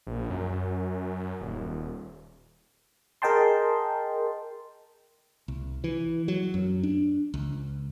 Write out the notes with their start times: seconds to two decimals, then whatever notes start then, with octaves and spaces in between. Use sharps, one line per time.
0.07 A#1
0.30 F#2
1.41 D#1
3.22 G#4 A#4 D#5 G5 A5 C6
5.48 C2
5.84 E3
6.28 F#3
6.54 F#2
6.83 D4
7.34 C#2